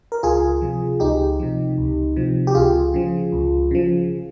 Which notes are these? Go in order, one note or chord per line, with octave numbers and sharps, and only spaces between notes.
A#4
C#2 F4 G#4
C3 F3
C#2 D#4 G4
C3 F3
C#2
C3 F3
G4
C#2 F4 G#4
C#3 F3
C#2
C#3 F3